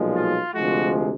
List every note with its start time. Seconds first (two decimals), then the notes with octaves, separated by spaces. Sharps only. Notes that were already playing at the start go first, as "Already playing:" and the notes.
Already playing: B1 A#2 F3 G#3
0.16 F4
0.54 D2 C3 F3 G#3 F#4